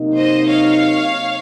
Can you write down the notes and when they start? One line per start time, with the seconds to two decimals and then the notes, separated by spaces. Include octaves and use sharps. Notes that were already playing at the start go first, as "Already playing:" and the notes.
Already playing: C3 F#3 A#3 D#4
0.18 C5 D#5
0.49 C#5 F5